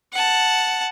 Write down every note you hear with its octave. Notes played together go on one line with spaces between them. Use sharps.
F#5 A5